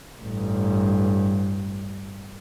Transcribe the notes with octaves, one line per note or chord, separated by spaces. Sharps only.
A1 G2